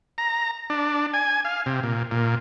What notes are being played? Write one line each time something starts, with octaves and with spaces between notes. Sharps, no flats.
A#5
D4
G#5
F5
C3
A#2
A#2